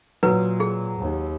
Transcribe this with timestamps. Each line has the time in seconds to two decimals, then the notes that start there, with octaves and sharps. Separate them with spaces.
0.23 A#2 F#3 B4
0.60 G#4
1.00 D#2